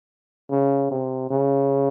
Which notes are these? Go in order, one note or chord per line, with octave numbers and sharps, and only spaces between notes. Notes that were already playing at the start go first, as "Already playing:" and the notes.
C#3
C3
C#3